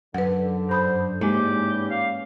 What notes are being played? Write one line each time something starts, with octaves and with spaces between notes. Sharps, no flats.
F#2 D3 B4 F#5
G2 C5 B5 D#6
E2 G#2 E3 G#3 A#3 C#4 G4
F5